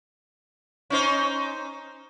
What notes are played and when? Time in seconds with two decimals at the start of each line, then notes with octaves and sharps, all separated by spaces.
0.90 C#4 D#4 C5